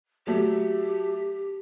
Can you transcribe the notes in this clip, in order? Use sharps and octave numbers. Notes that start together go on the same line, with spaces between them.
F#3 A3 G4